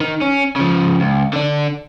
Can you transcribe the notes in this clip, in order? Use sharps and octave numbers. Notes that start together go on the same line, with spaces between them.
D#3
C#4
C#3 F3
C#2
D3 D4